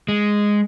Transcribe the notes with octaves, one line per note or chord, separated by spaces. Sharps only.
G#3